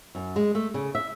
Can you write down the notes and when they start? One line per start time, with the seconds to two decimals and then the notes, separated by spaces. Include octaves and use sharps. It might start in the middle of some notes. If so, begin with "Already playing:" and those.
0.15 F#2
0.36 G#3
0.55 A3
0.74 C#3
0.95 E5